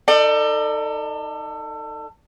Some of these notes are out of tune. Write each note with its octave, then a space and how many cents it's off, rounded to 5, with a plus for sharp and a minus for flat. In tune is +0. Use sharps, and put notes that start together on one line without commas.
D#4 +0 A4 +25 D5 +30